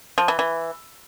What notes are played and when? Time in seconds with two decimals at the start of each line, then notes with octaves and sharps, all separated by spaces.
0.18 F3
0.28 E3
0.39 E3